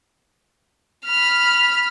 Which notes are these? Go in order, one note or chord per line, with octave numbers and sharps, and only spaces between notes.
B5 F6